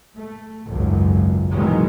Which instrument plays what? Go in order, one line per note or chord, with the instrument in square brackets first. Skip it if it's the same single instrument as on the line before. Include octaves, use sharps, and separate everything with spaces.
[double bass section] A3
G#1 C#2 F#2
B2 D#3 E3 F#3 G#3